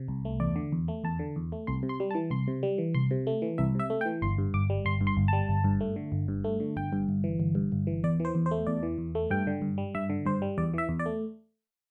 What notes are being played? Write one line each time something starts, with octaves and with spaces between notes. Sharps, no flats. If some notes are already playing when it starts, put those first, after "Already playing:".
Already playing: C3
C2
A3
E2 D5
D3
E2
A3
E2 A5
D3
E2
A3
C2 C6
C3
C6
G3
A5
E3
C2 C6
C3
G3
E3
C2 C6
C3
A3
E3
C2 E5
C3 E5
A3
G5
E3
G1 C6
G2
G1 D6
G3
G1 C6
G2
C6
G1
G3 A5
G1
G2
A3
D3
G1
G2
A3
D3
G1 G5
G2
G1
E3
G1
G2
G1
E3
E2 D5
E3 C5
E2
C5
A3
E2 D5
E3
E2
A3
G2 G5
D3
G2
G3
G2 E5
D3
G2 C5
G3
E2 D5
E3 E5
E2
D5
A3